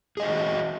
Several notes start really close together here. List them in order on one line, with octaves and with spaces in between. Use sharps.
G#4 D#5 C5 F#4